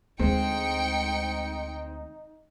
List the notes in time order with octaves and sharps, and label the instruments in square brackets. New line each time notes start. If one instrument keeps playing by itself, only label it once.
[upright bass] D2 [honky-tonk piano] G#3 C4 [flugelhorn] D#4 [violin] G5 C#7